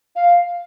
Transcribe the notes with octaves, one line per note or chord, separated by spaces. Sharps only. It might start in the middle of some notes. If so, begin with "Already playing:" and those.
F5